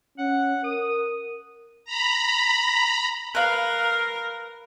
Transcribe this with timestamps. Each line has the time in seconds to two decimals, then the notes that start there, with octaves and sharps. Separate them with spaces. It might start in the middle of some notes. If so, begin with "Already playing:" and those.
0.18 C#4 F#5
0.64 A#4 D#6
1.85 A#5 B5
3.35 A#4 B4 F5